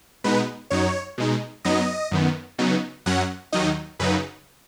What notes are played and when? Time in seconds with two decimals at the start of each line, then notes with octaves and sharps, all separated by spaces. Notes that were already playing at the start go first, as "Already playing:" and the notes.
0.24 B2 G#3 B3 D#4 B4
0.70 F#2 F#3 D#4 C#5
1.18 B2 G#3 D#4
1.65 F#2 F#3 B3 D#4 D#5
2.11 F#2 D#3 B3
2.58 C#3 F#3 B3 D#4
3.06 F#2 F#3 C#4 F#5
3.52 D#2 D#3 F#3 D#4 D#5
3.99 F#2 C#3 F#3 D#4 B4